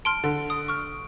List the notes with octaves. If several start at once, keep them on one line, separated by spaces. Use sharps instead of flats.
A5 C6 F6 D7
D3
D#6
C#6 F6